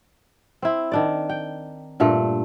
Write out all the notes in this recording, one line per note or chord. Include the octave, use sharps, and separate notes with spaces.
C4 E4
D#3 D4 D5
G5
G2 A#2 A3